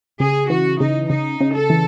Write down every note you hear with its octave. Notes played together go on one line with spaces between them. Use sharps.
C#3 G#4
E3 F#4
C#3 D#4
C#3 D#4
C#3
A4
E3